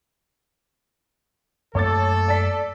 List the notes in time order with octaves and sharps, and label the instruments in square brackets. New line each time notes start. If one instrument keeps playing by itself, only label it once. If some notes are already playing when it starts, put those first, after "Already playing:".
[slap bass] F#2 A3 A#3 [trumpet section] A4 [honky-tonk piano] C#5 D6 A6
[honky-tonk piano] D5 A5 B6